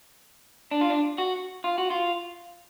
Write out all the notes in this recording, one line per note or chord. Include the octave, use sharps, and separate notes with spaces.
D4
F4
D4
F#4
F4
F#4
F4